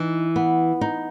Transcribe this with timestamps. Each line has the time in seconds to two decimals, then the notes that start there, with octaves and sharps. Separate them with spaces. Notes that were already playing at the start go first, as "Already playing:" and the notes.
Already playing: E3 D#4
0.36 B3
0.81 D#4